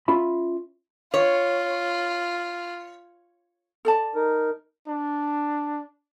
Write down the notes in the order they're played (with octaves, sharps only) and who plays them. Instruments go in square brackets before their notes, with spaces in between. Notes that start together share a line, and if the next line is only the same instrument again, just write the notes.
[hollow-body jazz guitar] C#4 F4 E5 B5
[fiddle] F4 [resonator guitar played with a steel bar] C#5
[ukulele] A4 D5 A5
[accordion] D#4 A#4
[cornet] D4